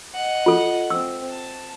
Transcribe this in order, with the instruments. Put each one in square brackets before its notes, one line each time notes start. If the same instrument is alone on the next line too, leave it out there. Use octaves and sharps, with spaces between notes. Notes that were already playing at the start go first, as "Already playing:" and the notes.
[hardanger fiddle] D#5 F#5
[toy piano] F4 A4
[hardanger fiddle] C4 [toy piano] E6
[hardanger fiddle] A5